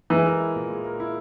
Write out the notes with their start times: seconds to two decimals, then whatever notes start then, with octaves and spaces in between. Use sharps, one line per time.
0.10 E3 G#3
0.26 A#4
0.40 E4
0.56 A#2
0.70 G#3
0.84 A#4
1.00 E4